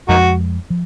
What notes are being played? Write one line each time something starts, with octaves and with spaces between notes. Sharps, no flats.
F2 F3 G#3 A#3 D#4 F#4
F3